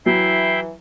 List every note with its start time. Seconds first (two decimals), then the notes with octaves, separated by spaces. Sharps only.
0.06 E3 F#3 E4 E5 G5 C7